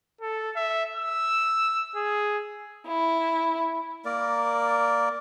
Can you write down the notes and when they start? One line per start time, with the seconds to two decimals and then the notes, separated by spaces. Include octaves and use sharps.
0.21 A4
0.56 E5
0.96 E6
1.96 G#4
2.88 E4
4.05 A#3 A#4 D5